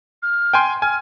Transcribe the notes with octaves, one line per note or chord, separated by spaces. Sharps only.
F6
G5 G#5 C6
G#5 F6